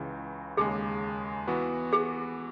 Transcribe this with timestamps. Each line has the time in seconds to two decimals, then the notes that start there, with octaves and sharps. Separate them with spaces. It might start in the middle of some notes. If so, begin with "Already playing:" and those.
Already playing: C#2 C#3 E3
0.57 D#2 C#3 G#3 G#4
1.47 E3 B3 F#4
1.93 G#4